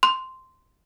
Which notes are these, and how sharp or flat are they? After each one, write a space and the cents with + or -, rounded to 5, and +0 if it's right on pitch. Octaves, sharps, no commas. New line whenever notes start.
C6 -5